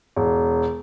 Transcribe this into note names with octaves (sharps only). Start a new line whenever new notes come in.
E1